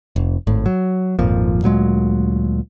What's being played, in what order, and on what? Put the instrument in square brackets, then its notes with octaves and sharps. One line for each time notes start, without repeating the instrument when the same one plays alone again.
[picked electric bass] F1
G#1 A2
F#3
G#1 F2 A#2 F3
D2 A#2 F#3 G#3